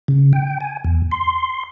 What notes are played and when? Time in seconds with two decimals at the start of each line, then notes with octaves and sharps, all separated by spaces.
0.08 C#3
0.33 G5
0.60 G#5
0.84 E2
1.12 C6